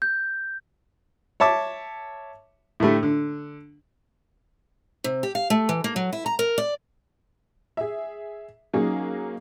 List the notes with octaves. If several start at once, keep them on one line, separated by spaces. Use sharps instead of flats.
G6
C#5 E5 A5 D6
A2 D3 A3 G4
D3
C3
G4
F5
A3
E3
A#3
F#3
E4
A#5
A#4
D5
G#4 E5
F#3 A#3 C#4 D#4 G#4